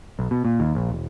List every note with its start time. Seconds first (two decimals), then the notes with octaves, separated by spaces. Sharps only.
0.19 B1
0.31 B2
0.45 A#2
0.60 D#2
0.75 A#1
0.90 E1